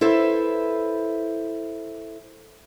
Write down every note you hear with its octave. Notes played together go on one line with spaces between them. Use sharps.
E4 A4 B4 C5 E5